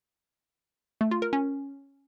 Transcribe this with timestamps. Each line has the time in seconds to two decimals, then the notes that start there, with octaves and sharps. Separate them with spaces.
1.01 A3
1.11 F4
1.22 A#4
1.33 C#4